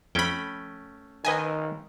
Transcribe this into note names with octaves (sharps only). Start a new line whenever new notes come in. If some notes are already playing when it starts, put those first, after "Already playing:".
F2 A3 C#4 G5 B5
D#3 B4 D#5 G#5